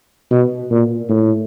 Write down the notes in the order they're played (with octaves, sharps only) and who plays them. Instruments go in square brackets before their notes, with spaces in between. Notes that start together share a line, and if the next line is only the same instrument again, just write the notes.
[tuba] B2
A#2
A2